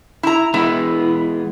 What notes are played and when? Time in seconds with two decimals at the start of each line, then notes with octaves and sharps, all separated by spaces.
0.23 E4 A#5
0.54 E3 G#3 B3 E4